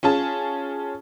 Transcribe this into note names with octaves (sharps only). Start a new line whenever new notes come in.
C#4 F4 G#4 A5